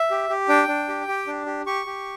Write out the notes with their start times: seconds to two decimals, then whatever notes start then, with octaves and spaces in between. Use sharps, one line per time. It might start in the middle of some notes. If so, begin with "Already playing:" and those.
Already playing: E5
0.11 G4
0.30 G4
0.48 D4 G5
0.68 D4
0.89 G4
1.08 G4
1.27 D4
1.46 G4
1.66 G4 C#6
1.86 G4